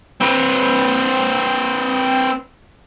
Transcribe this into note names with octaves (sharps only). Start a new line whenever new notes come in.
C4 B4